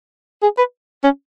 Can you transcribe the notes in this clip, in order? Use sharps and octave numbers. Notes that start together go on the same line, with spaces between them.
G#4
B4
C#4